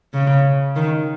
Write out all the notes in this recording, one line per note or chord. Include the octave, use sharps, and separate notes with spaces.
C#3
D#3